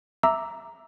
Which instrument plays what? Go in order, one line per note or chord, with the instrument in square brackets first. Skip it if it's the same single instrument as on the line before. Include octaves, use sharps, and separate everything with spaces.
[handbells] E5 A#5 D6 E6